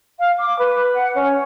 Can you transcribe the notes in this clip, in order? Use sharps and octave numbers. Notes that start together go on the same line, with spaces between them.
F5
D6
B4
F#5
C#4